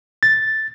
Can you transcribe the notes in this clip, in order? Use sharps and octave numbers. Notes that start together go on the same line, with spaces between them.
A6